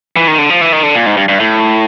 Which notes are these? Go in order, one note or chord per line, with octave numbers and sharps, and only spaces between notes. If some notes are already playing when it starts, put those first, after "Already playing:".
E3
D#3
D3
F3
E3
D#3
D3
A#2
G#2
G2
G2
A2